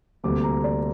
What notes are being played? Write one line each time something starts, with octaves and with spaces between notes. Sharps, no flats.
D2 C3 G3 A#3 D6
A#5
D5